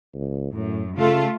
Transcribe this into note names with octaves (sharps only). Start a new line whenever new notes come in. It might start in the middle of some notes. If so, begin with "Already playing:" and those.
C#2
F#2 A2
C#3 A3 F4 A4